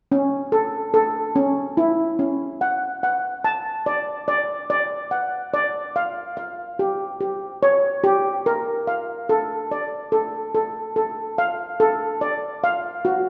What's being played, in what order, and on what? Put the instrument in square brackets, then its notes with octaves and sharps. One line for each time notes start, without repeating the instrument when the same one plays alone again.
[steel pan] C#4
A4
A4
C#4
E4
C#4
F#5
F#5
A5
D5
D5
D5
F#5
D5
F5
F5
G4
G4
C#5
G4
A#4
F5
A4
D5
A4
A4
A4
F5
A4
D5
F5
F#4